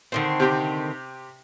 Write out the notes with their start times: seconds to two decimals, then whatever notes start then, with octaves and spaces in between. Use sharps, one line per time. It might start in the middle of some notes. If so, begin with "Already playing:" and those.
0.12 D3 D#3 C4
0.40 C3 G4